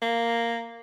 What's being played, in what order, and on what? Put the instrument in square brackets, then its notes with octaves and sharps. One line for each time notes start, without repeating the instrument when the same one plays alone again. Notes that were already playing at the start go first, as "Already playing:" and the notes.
[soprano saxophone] A#3